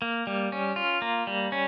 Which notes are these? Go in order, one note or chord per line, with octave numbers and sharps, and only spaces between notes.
A#3
G3
C#4
F4
A#3
G3
C#4